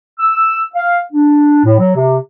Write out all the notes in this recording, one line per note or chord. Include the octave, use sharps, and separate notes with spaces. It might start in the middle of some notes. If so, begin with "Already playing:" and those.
E6
F5
D4
A2
F#3
C3